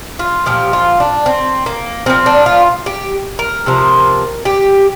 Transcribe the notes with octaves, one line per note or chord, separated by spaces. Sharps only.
F4
A#2 F3 G4
F4
D4
C4
A#3
A#2 F3 C4
D4
F4
G4
A#4
C3 F3
G4